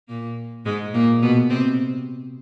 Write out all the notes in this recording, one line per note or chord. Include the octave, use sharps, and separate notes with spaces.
A#2 A#3
G#2 G#3
A#2 A#3
B2 B3
C3 C4